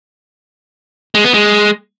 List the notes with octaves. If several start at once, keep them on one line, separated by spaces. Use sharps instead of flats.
G#3
B3
G#3